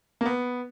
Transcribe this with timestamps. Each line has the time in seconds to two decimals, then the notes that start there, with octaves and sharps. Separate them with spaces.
0.21 A#3
0.26 B3